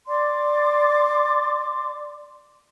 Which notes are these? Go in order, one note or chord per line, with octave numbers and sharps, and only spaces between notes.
D5 C6 D6